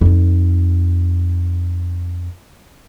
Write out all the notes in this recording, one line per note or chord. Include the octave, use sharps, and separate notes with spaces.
F2 D#4